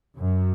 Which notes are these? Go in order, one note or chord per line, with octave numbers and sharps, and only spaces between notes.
F#2